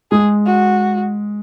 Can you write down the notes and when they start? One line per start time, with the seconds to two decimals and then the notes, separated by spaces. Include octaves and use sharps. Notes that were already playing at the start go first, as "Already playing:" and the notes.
0.11 G#3 G#4
0.46 F#4